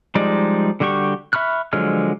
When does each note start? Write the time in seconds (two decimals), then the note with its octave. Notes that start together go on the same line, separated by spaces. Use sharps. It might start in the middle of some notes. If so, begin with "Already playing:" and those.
0.15 F3 G3 G#3 D#4 D5
0.80 D3 G3 F#4 G4 C#6
1.33 E5 B5 C#6 F6 F#6
1.73 D3 F3 F#3 G#3 F6